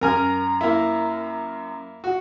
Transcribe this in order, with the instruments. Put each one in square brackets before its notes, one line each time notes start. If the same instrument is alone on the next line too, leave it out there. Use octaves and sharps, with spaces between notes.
[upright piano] F#2 A#5 F6 [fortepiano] A#4 G#5
[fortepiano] A#3 E4
F#4